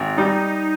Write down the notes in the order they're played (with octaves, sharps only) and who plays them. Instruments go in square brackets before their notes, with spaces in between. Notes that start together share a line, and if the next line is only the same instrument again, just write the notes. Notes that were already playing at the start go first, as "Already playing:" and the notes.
Already playing: [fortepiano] G#1
[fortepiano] G3 [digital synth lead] D#4